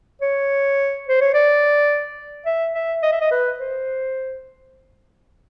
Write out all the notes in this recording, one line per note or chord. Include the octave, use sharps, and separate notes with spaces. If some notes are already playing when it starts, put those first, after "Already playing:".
C#5
C5
C#5
D5
E5
E5
D#5
E5
D#5
B4
C5